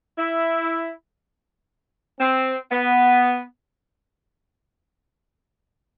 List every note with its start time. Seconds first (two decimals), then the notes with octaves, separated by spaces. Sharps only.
0.18 E4
2.20 C4
2.71 B3